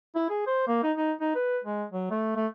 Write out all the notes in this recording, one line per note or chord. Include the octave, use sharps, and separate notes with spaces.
E4
G#4
C5
A#3
D#4
D#4
D#4
B4
G#3
F#3
A3
A3